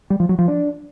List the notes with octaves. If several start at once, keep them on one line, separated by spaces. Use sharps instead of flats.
G3
F3
F#3
F3
D4